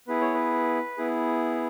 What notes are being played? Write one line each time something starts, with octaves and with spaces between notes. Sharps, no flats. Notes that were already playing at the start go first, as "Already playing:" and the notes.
B3 E4 G#4 B4
C#5
B4
B3 E4 G#4